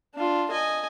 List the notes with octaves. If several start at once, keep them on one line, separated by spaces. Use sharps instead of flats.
D4 F4
D#5 G#5